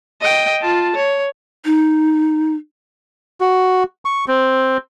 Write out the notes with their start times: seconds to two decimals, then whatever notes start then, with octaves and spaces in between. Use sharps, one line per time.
0.21 D#5 G5
0.62 F4 A5
0.96 C#5
1.65 D#4
3.40 F#4
4.05 C#6
4.28 C4